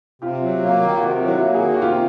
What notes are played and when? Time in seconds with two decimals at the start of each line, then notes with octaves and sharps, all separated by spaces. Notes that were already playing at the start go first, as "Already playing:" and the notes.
0.22 C3 F4 G4
0.42 F#3
0.62 A#3
0.83 D#3
0.97 F#4
1.01 C3 F4 G4
1.22 F#3
1.28 E4 F#4
1.42 A#3
1.54 F#4 G#4
1.62 D#3
1.74 F#4
1.81 C3 F4 G4